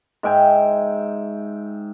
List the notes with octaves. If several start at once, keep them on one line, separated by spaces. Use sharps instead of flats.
G#2 E5 G5 G#5